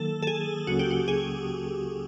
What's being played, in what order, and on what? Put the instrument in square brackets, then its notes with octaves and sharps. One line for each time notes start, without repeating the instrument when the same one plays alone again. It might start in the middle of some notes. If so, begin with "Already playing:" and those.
Already playing: [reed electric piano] D#3 F#3 A#3 [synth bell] A4
[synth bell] A4
G#4
[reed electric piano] C#2 C#3 F#3 A#3 C#4 [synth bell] F#4
[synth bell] G4
F#4
G#4